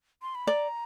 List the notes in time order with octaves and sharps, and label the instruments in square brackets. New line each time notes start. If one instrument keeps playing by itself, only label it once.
[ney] C6
B5
[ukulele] D5 [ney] A#5